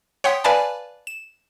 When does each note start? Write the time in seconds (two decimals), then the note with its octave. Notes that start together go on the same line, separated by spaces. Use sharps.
0.24 C#5 F#5 G5 C6 D#6 B6
0.44 B4 D5 F5 G#5 A5 B5
1.07 E7